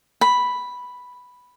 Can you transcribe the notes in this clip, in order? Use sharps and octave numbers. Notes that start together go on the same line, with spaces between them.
B5